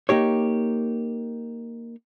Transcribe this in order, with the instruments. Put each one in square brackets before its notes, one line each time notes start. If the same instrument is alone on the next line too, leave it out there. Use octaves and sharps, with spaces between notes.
[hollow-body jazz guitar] A#3 D#4 G4 C#5